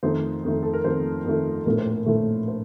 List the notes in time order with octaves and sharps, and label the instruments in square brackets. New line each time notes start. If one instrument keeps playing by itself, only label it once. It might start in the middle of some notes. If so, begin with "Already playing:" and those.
[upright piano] F2 D#3 A3 C5
F2 D#3 A3
A4
A#4
F2 D#3 A3 C5
F2 D#3 A3
A#1 A2 A3 A#4
C5
A#4
A#1 A2 A3
C5